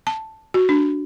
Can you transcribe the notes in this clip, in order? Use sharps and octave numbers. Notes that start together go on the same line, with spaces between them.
A5
F#4
D4